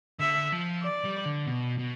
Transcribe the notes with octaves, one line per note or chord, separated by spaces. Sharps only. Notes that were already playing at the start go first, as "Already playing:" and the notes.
D3 E5
F3
D5
G3
D3
B2
B2